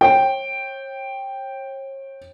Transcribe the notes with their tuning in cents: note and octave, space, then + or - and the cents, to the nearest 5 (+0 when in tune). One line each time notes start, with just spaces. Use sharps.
C#5 -40 G5 +0